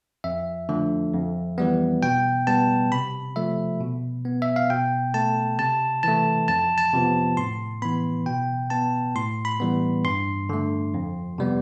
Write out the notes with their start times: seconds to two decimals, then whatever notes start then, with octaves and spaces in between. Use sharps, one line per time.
0.24 F2 E5
0.69 D3 F3 A3
1.13 F2
1.58 E3 G3 B3
2.02 B2 G5
2.47 G3 B3 A5
2.92 C3 B5
3.36 F3 A3 E5
3.81 B2
4.25 B3
4.42 E5
4.56 F5
4.70 B2 G5
5.14 A3 A5
5.59 C3 A5
6.03 E3 A3 A5
6.48 F2 A5
6.78 A5
6.93 C3 F3 B3
7.37 A2 C6
7.82 E3 B3 B5
8.26 B2 G5
8.70 B3 A5
9.15 A2 C6
9.45 B5
9.60 E3 G3 B3
10.04 G2 C6
10.49 D3 A3
10.94 F2
11.38 C3 G3 B3